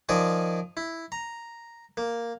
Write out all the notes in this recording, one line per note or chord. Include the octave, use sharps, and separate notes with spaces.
D#3 F3 D5 D#5 G#5 D#6
E4
A#5
A#3